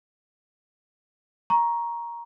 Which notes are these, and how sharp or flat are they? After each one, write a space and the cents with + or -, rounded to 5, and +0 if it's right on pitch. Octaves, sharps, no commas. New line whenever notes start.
A#5 +10 C#6 +0